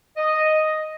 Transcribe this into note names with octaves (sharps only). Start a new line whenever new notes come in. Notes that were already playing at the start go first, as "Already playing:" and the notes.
D#5